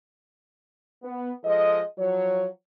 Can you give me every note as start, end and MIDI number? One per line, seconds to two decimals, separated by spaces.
1.03 1.30 59
1.44 1.81 53
1.44 1.81 56
1.44 1.81 69
1.44 1.81 75
1.98 2.47 53
1.98 2.47 54
1.98 2.47 73